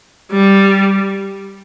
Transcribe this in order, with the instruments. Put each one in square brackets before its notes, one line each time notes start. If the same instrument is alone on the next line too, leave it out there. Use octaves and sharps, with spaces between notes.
[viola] G3